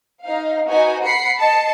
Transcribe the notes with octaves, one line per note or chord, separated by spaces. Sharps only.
D#4 F5
D#4 F#4 B4 G#5
F#5 B5 C7 C#7
D#5 A5 C7 C#7